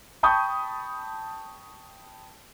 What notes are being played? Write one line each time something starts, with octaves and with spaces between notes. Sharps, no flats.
G5 A5 B5 C#6 D#6 G6